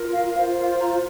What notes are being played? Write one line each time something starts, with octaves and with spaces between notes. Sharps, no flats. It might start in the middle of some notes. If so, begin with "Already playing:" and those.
Already playing: F4 A#4
F5
F4 C5 F5
F5
A#5